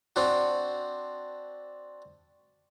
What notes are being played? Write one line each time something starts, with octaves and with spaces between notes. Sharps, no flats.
C4 D4 F#4